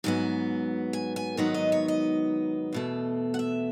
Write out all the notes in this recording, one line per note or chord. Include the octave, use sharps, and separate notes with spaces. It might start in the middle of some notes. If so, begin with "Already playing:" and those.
G#2 F#3 B3 G#5
G#5
G#5
G#2 D#3 F#3 B3 D#4 F#5
D#5
C#5
D#5
E2 B2 A3
F#5
E5